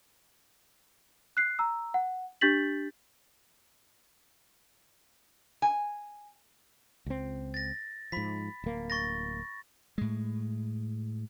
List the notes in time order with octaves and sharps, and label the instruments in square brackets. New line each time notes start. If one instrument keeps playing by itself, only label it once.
[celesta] F#6 C7
A#5 E6
F#5
D4 G4 G6 A6 B6 F#7
[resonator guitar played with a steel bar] G#5
[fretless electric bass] C#2 C4
[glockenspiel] A6 A#6
[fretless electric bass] G#2 F3 [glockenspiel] B5 B6
[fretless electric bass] D1 A#3
[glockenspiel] C#6 A6 A#6
[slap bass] A2 G#3